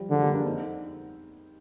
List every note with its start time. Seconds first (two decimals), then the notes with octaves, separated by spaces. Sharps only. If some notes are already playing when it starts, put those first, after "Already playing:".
Already playing: F3 G3
0.10 D3 F3 G#3
0.22 G3 A#3
0.34 A#3 D4
0.45 C4 D#4